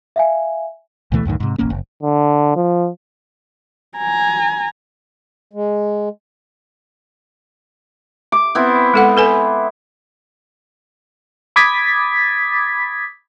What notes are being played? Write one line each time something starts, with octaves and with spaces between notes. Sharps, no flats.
E5 F5 G#5
D2 B2 E3 A3
C#2 F#2 A2 D#3
G#2 C3
E1 A1 A#3 C#4
F#1
D3
F3
G#5 A#5
G#3
D6
B3 C4 E4
G#3 A4 F#5
A4 B4 G#5
B5 D6 D#6 G#6 A6 B6